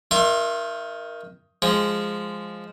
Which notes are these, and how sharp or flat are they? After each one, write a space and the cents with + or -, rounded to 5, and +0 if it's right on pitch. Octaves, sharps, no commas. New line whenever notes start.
D#3 +10 E5 +45 C6 +30
F3 +0 G#3 +0